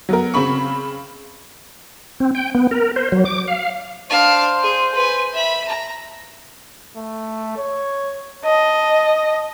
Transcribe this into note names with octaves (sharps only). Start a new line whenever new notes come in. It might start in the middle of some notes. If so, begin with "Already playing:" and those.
F#3 B3 A#4
C#3 C4 B5 C#6
C4
G5
B3
A#4
C5
F#3
D6
F5
D4 C5 F5
G#4
B4 G#5
E5 B5
A#5
A3
C#5
D#5 A5